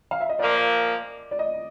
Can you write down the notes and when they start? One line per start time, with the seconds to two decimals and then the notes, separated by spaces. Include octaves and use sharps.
0.11 F5
0.21 E5
0.29 D#5
0.39 A#2 F3 A#3 D5
1.31 D5
1.39 D#5